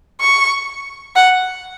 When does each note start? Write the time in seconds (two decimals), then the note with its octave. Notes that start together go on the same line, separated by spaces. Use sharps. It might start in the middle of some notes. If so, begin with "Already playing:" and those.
0.21 C#6
1.16 F#5